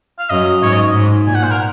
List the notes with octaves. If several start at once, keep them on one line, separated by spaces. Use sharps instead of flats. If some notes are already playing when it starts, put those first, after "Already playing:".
F5
F#2 D#5
G#2 C#5
D#5
G#2
A#2 G#5
F#5
C5
A#4